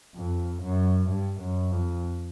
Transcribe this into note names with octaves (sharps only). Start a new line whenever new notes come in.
F2
F#2
G2
F#2
F2